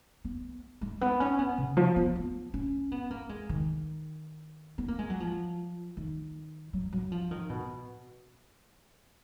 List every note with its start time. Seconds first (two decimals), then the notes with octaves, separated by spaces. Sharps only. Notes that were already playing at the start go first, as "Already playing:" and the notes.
0.25 B3
0.81 G#3
1.01 B3
1.20 C#4
1.39 B3
1.58 C#3
1.77 F3
1.96 B3
2.16 B3
2.54 C#4
2.92 B3
3.11 A#3
3.29 G#3
3.49 D#3
4.78 B3
4.88 A#3
4.99 G#3
5.10 F#3
5.20 F3
5.97 D#3
6.73 F#3
6.93 F#3
7.12 F3
7.31 D#3
7.50 B2